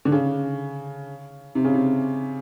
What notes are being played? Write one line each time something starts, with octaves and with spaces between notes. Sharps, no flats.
D3
C#3
C3
C#3
C3